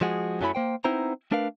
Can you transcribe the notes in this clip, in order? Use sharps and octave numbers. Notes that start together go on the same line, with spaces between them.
F3 G#3 F#4 G#4
F#2 F#3 A3 C#4 E4 B5
A#3 C5 G5
B3 C4 D#4 E4 C5 A#5
A3 D4 A#4 B4 F5